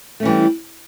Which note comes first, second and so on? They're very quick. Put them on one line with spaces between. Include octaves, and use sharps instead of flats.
A3 C#4 E3 G3